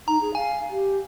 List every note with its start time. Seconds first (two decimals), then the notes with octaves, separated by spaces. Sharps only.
0.08 D#4 A#5
0.21 G#4
0.35 F5 G#5
0.70 G4